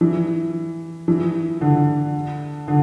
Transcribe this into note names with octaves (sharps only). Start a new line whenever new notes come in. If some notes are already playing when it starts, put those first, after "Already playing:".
E3
E3
D3
D3